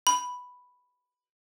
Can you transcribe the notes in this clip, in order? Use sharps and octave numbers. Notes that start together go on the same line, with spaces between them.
B5